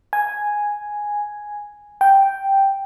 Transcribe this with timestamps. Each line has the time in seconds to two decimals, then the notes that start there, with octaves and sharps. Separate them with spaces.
0.13 G#5
2.01 G5